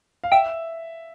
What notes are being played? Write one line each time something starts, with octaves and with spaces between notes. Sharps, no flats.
F5
E5 G5